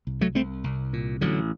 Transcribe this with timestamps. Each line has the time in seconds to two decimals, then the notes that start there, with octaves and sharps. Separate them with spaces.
0.07 C2
0.21 F#3 A3
0.35 C2 A3 C4
0.64 C2
0.93 A#2
1.21 A1 D3 F#3